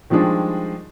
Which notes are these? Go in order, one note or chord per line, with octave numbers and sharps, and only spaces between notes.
D#3 F3 G3 G#3 D4